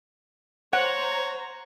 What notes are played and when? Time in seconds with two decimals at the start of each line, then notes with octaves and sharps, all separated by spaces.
0.73 C5 C#5 F#5 A#5